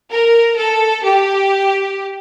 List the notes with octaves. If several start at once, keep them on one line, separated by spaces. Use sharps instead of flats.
A#4
A4
G4